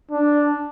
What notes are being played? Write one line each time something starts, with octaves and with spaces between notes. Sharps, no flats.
D4